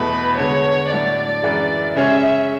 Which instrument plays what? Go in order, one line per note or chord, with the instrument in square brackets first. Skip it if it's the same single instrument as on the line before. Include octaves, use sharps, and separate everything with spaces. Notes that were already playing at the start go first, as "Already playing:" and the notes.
Already playing: [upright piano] E2 B2 A3 [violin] B4
[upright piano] D3 G#3 B3 [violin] C#5
[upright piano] A2 F#3 A3 D4 [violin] D5
[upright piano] F#2 E3 G#3
[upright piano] C#3 G#3 C#4 G#4 C#5 [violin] E5